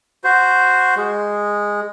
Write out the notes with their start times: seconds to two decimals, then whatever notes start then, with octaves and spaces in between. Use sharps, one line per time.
0.24 F#4 C5
0.97 G#3